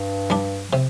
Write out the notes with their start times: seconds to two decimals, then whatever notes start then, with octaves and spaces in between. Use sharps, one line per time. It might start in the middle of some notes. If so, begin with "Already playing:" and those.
Already playing: G2
0.30 G3 D4
0.73 C3